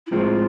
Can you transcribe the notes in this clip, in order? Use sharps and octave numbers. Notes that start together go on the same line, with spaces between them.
E4
A2 F3 G#3 C4 F4